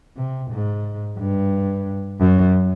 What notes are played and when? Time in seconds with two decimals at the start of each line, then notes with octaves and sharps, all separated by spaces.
0.17 C3
0.51 G#2
1.18 G2
2.20 F#2